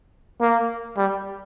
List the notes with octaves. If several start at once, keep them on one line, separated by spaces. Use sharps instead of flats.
A#3
G3